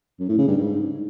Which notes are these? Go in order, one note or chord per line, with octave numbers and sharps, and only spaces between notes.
F#2
A2
C#3
G2
G#2